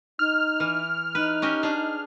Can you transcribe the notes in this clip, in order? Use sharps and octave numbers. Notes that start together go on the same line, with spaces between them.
D#4 F6
E3
D#4 B4
C#4 G4 D#5
D4 G#4